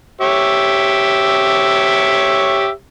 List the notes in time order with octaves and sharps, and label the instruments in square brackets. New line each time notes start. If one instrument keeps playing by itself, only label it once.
[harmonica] G4 C#5 E5